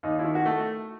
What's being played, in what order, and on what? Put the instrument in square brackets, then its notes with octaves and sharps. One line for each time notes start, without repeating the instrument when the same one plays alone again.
[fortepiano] D#2 D#4
E4
D#3
F#4
A3